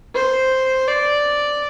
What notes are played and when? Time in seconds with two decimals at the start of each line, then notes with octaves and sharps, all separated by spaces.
0.15 C5
0.87 D5